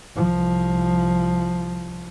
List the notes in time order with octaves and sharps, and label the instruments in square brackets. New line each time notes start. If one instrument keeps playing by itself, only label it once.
[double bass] C2 F3